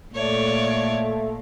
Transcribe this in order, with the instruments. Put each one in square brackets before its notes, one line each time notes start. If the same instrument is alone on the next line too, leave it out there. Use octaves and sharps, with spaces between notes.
[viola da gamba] A#2 [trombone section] A3 [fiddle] C#5 D5